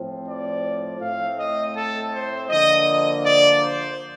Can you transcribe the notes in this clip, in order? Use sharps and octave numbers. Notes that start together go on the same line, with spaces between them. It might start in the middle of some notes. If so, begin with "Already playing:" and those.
Already playing: A2 F3 C4
D5
A2 A3 C4 F5
D#5
A4
C5
D3 F3 A#3 D#5
D#5
D5
C5